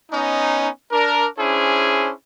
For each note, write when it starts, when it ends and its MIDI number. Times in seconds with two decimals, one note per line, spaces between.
0.12 0.69 59
0.12 0.69 61
0.12 0.69 63
0.92 1.27 62
0.92 1.27 70
1.39 2.12 61
1.39 2.12 62
1.39 2.12 64
1.39 2.12 68
1.39 2.12 72